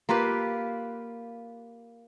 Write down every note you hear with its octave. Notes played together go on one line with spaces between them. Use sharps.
A#3 F4 G4 B4